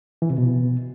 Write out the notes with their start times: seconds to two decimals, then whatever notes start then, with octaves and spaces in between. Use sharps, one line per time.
0.22 E3
0.30 C3
0.38 B2